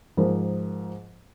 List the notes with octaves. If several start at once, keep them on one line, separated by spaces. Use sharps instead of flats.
G#2 F3 A#4